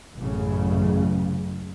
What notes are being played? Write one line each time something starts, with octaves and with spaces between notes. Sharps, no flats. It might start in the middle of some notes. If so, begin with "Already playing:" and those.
A1 F#2 C#3